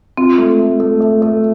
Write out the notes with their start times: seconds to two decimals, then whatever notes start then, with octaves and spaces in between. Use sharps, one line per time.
0.18 C4 F4
0.38 A3
0.59 A3
0.80 A3
1.00 A3
1.22 A3